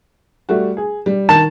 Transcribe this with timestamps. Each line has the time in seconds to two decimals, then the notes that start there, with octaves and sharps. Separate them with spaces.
0.49 G3 A3 F#4
0.77 G#4
1.06 G3
1.29 D#3 A5